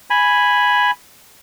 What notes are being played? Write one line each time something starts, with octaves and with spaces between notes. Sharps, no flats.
G#5 B5